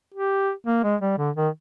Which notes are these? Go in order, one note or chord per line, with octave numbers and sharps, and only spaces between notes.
G4
A#3
G#3
G3
D3
D#3